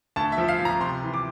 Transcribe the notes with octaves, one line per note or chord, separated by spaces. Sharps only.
D2 A5
E5
F3
F5
F3
A#5
C3 C6
E3
D6